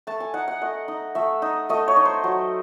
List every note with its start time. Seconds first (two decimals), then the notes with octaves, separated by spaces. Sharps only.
0.07 A3 A5
0.20 G#5
0.34 D#4 F#5
0.48 F#5
0.61 A3 D#5
0.88 D#4
1.15 A3 E5
1.42 D#4
1.69 A3 D#5
1.88 C#5
1.97 D#4
2.05 C5
2.24 F#3